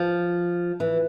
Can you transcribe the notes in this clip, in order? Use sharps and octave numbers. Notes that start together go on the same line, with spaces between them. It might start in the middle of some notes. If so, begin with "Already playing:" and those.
Already playing: F3
E3